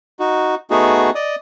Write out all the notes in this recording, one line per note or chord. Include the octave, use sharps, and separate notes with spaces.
D#4 F#4
A3 B3 D#4 F#4 G#4
D5 D#5 D#6